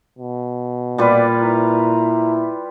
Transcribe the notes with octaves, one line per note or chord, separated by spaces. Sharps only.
B2
A#2 G3 F4 B4 D5
E4 A#5